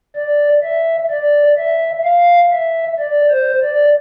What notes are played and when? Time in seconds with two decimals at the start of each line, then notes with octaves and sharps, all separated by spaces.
0.16 D5
0.63 E5
1.10 D5
1.58 E5
2.04 F5
2.52 E5
2.99 D5
3.30 C5
3.62 D5